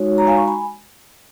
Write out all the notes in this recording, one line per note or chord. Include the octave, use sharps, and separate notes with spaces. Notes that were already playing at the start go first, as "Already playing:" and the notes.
Already playing: G#3 D#4 F#4 C#5
A#5
F5 G#5
A#5 C#6
G#5 B5